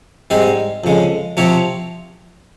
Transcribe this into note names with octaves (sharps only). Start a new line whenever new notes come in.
G#2 G3 C4 D#4 G#4
F2 C#3 G#3
C3 F3 C4 G4 C#5